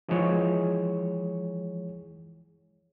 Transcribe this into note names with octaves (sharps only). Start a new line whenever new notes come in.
E3 F3 G#3 G#4 C#5